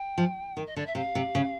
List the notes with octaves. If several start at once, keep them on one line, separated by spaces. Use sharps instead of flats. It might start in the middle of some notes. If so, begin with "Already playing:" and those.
Already playing: G5
F3
D#3
D#5
D3 D5
E5
C3 F5
C3
C#3